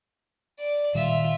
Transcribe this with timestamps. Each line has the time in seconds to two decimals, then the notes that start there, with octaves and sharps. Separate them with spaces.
0.59 D5
0.95 A#2 D#3 G3 F4 E5